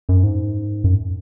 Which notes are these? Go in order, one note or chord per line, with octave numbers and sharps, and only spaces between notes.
F#2
G#2
F#2